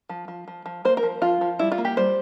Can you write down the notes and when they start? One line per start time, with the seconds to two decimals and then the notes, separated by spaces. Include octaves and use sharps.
0.09 F3
0.28 F3
0.48 F3
0.66 F3
0.85 A#3 C5
0.97 A#4
1.03 F3
1.22 F3 F4
1.41 F3
1.59 G3 E4
1.72 F4
1.78 A#3
1.85 G4
1.97 G3 C5